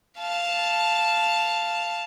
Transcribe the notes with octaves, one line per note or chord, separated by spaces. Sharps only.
F5 A5